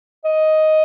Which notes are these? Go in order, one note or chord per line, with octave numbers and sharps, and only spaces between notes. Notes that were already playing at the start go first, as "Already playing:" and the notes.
D#5